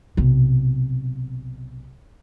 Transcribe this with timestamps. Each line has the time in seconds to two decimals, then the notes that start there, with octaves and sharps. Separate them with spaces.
0.17 B1 C3